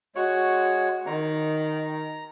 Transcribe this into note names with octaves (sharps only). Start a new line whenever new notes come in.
G#3 F#4 C#5
D#3 A#5